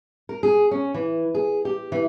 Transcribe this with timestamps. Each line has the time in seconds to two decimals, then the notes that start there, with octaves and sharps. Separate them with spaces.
0.29 A#4
0.43 G#4
0.71 C#4
0.94 E3
1.34 G#4
1.65 G4
1.92 E3